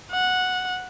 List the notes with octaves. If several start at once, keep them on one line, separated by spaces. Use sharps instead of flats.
F#5